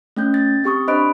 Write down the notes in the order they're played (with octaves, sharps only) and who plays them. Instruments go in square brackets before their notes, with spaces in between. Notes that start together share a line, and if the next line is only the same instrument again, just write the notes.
[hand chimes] A3 C#4 G6
A6
C4 G4 C#6 D#6
D4 C5 D#5 B5 F#6 D7